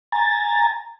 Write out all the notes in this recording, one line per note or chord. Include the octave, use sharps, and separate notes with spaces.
G#5 A#5 A6